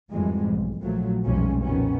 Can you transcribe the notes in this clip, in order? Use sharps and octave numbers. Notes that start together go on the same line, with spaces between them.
G#1 F2 G#2 E3 G3 G#3
B1
A#1 A#2 F3 F#3 A3
B1 F2 F3 G3 G#3 C#4
F2 A#2 D#3 B3 C#4